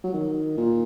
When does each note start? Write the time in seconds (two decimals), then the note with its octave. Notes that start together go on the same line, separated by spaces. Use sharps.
0.04 F#3
0.13 D#3
0.57 A#2